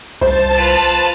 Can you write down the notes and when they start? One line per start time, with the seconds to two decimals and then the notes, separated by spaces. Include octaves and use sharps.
0.21 C2 C5 A5
0.57 F4 B4